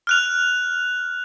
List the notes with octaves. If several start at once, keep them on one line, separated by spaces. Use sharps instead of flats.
F6 F#6 F7